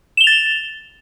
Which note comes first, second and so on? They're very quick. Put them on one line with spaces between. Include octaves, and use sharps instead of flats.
E7 G7 F7 A6